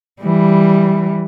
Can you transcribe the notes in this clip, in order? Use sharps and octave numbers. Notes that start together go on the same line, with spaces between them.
E3 G3